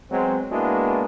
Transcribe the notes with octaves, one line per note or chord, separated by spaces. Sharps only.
F#3 G#3 B3 C4
G#3 A#3 B3 D4 E4 F#4